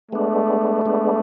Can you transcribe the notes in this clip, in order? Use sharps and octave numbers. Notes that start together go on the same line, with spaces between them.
G#3 A3 B3 D4
G#3 B3 D4